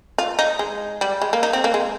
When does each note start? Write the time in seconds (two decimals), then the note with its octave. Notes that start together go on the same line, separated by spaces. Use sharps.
0.18 F4
0.39 D#4
0.59 G#3
1.01 G3
1.22 G#3
1.33 A#3
1.43 D#4
1.53 C4
1.64 A#3
1.74 G#3